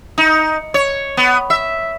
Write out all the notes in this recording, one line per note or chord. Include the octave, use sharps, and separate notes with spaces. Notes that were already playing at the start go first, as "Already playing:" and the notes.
D#4
C#5
B3
E5